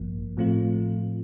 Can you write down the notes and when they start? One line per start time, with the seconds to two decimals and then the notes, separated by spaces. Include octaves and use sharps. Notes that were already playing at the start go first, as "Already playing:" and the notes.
Already playing: A1 G2 F3 A#3
0.37 A2 F3 A3 C4 F4